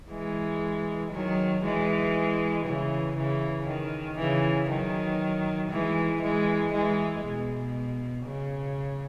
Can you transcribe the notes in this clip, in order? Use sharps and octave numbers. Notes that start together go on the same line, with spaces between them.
E3 G#3
D#3 F#3
E3 G#3
C#3 E3
C#3 E3
D#3
C#3 E3
D#3 F#3
E3 G#3
E3 G#3
E3 G#3
B2
C#3